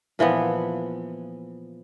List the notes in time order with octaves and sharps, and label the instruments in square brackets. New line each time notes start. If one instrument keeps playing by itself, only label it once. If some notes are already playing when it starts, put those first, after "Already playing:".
[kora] A#2 E3 F3 B3